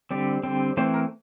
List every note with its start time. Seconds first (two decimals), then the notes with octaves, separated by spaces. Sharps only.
0.11 D3 G3 C4 D5
0.43 D3 G3 C4
0.77 E3 A3 C4 C5
0.94 A#4